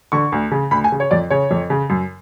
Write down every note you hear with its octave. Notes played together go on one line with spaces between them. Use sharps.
D3 C#6
D2
C#3
D2 B5
G#5
C#3
C#5
F2 D5
C#3 C#5
F2
C#3
F#2